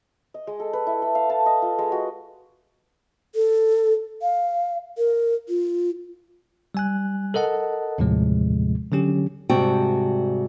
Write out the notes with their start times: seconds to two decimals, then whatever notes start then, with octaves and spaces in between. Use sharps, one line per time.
0.34 D#5
0.47 G#3
0.60 A4
0.73 B4
0.87 E4
1.02 A4
1.15 F5
1.30 A5
1.46 D#5
1.62 F4
1.79 G#3
1.92 F#4
3.35 A4
4.22 F5
4.98 A#4
5.49 F4
6.75 G3 G#5 F#6
7.34 A4 A#4 D#5 F#5 A5
7.98 D#2 A2 C3 F3 G#3
8.92 D3 F#3 C#4 G4
9.49 G#2 C3 G3 F#4 G5 A5